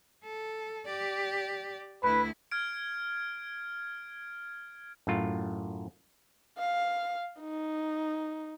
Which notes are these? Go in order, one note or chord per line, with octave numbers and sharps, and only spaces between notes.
A4
G4 D5
D2 E4 B4
F6 G#6 D7
F#2 A2 F4
F5
D#4